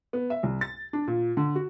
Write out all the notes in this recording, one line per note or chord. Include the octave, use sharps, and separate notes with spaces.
B3
E5
C2
A6
D4
A#2
D3
F#4